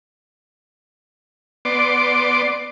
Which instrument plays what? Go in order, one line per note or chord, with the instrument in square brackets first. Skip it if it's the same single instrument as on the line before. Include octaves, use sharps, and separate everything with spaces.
[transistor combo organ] B3 D5 C6 D6